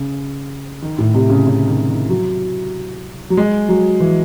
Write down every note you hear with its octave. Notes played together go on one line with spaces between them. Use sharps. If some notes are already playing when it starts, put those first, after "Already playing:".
Already playing: C#3
D#3
A2
C3
C#3
C#3
D#3
D#3
F#3
F#3
G#3
F#3
E3